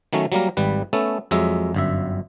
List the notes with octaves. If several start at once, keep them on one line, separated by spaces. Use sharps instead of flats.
D#3 F#3 A3 C#4
F#3 G3 A#3 A#4
G#1 G3 B4
A3 B3 C#4 A4
F2 F#3 G#3 E5
G1 F#2 E5